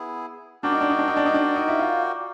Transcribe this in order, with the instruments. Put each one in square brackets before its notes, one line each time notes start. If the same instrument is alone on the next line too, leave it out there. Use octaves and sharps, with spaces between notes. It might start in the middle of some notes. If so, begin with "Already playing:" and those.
Already playing: [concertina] B3 E4 G#4
[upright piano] D4 [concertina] F#4 A#4 D5 G5
[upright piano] D#4
D4
D#4
D4
D#4
D4
D#4
D4
D#4
E4
F4